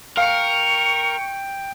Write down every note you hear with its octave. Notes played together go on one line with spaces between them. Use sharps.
A#4 F5 G5 C#6